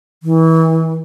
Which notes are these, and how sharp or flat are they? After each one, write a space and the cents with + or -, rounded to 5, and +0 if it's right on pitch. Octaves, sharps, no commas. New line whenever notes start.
E3 -30